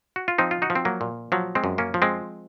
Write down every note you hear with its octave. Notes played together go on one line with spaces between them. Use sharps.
F#4
F4
F3 C4 D#4
F4
D#4 F#4
F3
C4
F#3 A#3
A#2
F3 F#3
G#3 C4
F#2
A#3 C#4
F3
G#3 C4